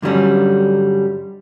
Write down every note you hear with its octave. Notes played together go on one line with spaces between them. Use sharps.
G2 D3 F#3 G3 C#4